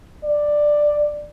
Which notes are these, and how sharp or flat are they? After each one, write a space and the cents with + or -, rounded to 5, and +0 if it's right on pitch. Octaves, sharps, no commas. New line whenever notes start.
D5 +10